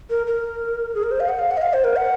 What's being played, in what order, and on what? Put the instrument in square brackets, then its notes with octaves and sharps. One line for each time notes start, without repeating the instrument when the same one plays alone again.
[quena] A#4
A#4
G#4
A#4
C5
F5
F#5
F5
F#5
D#5
F5
C5
A#4
F#5